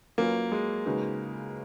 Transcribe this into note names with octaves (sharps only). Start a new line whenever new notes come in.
F#3 A#3 C#4 F4 B4
G#3
C#3 G#3 D#4 F#4 B4